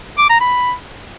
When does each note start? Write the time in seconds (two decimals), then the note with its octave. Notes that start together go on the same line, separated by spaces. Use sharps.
0.18 D6
0.29 A#5
0.41 B5